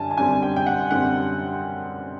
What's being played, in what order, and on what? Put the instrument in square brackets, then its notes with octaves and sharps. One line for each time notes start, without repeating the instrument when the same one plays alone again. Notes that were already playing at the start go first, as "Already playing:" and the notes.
Already playing: [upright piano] F#2 D3 G3 G#5 A5
A5
F#2 D3 G3 C4 G#5
G5
G5
F#5
F#2 D3 G3 C4 F#5